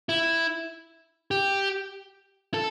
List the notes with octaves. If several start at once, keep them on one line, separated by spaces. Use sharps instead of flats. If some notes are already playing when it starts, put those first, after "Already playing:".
E4
G4
A4